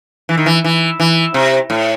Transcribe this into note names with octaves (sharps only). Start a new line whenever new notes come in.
E3
D#3
E3
E3
E3
C3
A2